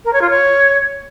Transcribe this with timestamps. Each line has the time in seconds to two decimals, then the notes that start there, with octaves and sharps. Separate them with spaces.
0.05 A#4
0.13 C#5
0.21 F4
0.30 C#5